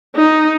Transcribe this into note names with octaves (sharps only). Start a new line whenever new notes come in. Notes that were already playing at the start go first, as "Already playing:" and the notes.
D#4